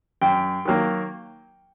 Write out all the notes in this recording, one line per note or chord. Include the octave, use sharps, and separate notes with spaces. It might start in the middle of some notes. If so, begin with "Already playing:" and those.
F#2 G5
D#3 F#3 A#3